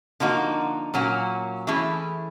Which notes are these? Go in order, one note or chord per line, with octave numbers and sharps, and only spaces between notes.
D3 F3 A#3 D#4 F#4
A#2 F#3 A#3 C#4 F#4
E3 A3 C#4 E4 G#4